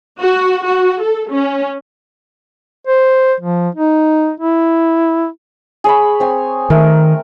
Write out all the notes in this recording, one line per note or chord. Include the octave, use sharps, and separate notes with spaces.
F#4
F#4
A4
C#4
C5
F3
D#4
E4
G#4 C#5 B5
C4 C#5 G#5
D#3 A3 A#4